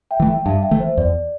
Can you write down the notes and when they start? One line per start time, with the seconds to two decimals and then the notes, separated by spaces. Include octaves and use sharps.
0.11 E5 G5
0.20 E3 A3
0.28 E5 G5
0.45 G2 F5 A5
0.63 E5 G5
0.71 E3 A3
0.80 C5
0.97 E2 D5